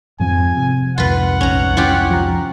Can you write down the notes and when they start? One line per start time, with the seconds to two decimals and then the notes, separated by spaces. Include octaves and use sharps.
0.20 F2 G#2 F3 C4 G#5
0.57 C3
0.98 C2 F2 G#2 F4 B4 F#5
1.41 A#1 C#4 A#5
1.77 C#4 E4 F4 G4
2.11 F3 A#5